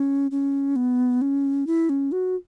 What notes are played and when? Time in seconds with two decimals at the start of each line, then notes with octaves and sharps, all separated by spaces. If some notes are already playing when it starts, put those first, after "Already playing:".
Already playing: C#4
0.31 C#4
0.76 B3
1.22 C#4
1.67 E4
1.89 C#4
2.12 F#4